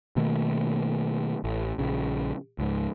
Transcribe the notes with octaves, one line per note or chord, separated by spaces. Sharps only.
B2 D#3 A3 A#3
A1
A#1 C#3
C#2 G#2